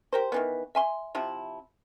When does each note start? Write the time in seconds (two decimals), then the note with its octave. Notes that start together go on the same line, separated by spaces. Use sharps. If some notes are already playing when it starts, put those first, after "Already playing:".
0.13 G4 A#4 C5
0.32 D#3 E3 B3
0.75 E5 G#5 C6
1.15 C3 F3 E4